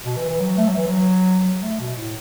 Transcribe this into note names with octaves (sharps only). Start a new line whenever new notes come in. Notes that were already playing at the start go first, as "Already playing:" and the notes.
B2
E3
E3
F#3
A3
F#3
E3
F#3
F#3
A3
B2
A2